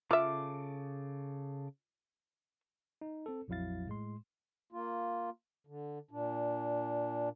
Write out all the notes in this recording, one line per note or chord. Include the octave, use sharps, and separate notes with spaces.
C#3 F4 A4 E5 D6
D#4
C4 A4
A#1 F2 F#3 E4 F5 A6
A2 G#3 C6
A#3 F4
D3
A#2 D4